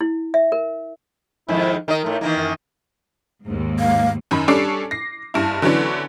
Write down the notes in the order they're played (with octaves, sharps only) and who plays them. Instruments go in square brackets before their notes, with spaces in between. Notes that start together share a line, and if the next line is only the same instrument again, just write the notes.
[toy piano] E4
E5
A#4
[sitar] F2 G#2 D#3 [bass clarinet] E4
[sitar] D#3 D#5 [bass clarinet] A#4
[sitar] A2 A3
[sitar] D#3 E3 A#3 [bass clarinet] D#4
[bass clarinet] F#2
[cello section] D#2 G#2
[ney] F5
[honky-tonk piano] F#2 D#3 B5
G3 C#4 D4 A4 D6 C7
A#6 C7
F#1 G2 E4
D3 E3 F#3 B3 C#4 D4